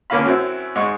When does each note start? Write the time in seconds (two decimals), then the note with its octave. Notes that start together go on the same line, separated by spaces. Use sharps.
0.10 D3 A#3 C#4 F4 F5 B5
0.25 F#2 F#3 C4 E4
0.76 G#2 G#3 C#6